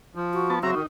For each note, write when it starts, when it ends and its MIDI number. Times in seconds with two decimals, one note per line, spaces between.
0.15 0.61 53
0.33 0.55 66
0.50 0.59 59
0.50 0.59 81
0.63 0.71 49
0.63 0.75 54
0.63 0.75 60
0.63 0.80 66
0.63 0.75 76
0.63 0.71 82
0.75 0.83 51
0.75 0.86 63